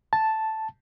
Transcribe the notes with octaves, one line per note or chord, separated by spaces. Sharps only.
A5